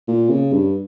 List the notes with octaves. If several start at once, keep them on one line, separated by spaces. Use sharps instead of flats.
A#2
C#3
G2